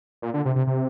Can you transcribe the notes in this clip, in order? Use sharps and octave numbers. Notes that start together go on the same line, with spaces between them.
A#2
D3
C3
C3
C3